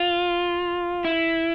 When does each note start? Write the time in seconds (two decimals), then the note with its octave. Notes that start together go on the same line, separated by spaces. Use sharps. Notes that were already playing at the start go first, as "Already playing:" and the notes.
Already playing: F4
1.05 E4